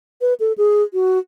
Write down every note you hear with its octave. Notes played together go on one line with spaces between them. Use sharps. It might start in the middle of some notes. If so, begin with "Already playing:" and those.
B4
A4
G#4
F#4